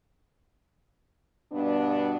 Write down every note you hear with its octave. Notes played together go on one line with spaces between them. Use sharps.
G2 B2 B3 D4